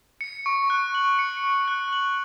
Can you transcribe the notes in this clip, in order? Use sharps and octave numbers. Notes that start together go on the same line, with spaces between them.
C#7
C#6
F#6
F#7
C#7
C#6
F#6
F#7